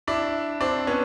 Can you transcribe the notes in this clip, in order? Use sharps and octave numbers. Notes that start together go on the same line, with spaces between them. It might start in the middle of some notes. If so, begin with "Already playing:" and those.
D4 E4
C4 D4
B3 C#4